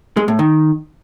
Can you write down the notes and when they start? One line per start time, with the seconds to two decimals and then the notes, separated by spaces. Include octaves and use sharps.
0.17 G#3
0.28 A2
0.39 D#3